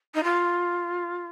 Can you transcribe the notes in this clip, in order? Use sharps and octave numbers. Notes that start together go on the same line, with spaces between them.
D#4
F4